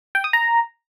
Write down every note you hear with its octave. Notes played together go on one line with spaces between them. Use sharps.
G5
D#6
A#5